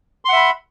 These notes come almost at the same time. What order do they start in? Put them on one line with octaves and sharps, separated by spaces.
C6 F#5 E5 B5